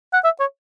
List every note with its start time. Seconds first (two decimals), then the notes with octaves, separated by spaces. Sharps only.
0.13 F#5
0.24 E5
0.40 C#5